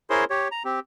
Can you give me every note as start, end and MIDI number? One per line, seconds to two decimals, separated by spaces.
0.10 0.25 64
0.10 0.25 68
0.10 0.25 70
0.10 0.25 72
0.10 0.25 73
0.10 0.25 84
0.30 0.48 67
0.30 0.48 73
0.52 0.63 82
0.65 0.80 60
0.65 0.80 67